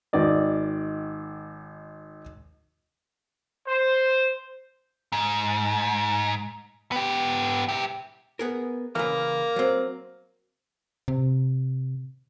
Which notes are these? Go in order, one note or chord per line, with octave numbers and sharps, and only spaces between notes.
G#1 D#3 D5 D#5
C5
G#2
B3 G4
E4 G4
B3 G#4 A#4
C#3 E3 A#3
F#3 C4
C3